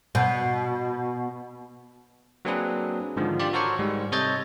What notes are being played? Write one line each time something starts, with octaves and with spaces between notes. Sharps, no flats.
B2
F#3 A#3 C4 D4 G#4 B4
G#2 D3 D#3 F3
F4 G4 D5
F#4 A4 A#4 C5 C#5 C#6
G#2 G3
C3 A4 C#5 D#5 G6 A6